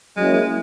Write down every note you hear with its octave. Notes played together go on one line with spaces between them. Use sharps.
F#3 G#3 A#3 C#4 E4
G#3